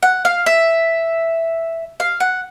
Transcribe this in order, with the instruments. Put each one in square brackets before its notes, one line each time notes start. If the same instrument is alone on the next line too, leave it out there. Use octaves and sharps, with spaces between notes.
[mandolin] F#5
F5
E5
F5
F#5